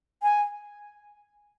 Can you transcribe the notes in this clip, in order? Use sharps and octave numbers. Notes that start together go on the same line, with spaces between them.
G#5